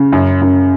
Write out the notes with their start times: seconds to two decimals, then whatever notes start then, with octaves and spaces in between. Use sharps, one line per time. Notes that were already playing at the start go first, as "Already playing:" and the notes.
Already playing: C#3
0.12 F#2
0.41 F#2